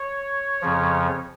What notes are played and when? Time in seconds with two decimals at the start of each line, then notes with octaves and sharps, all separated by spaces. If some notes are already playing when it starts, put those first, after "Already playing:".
Already playing: C#5
0.62 F2 C#3 F3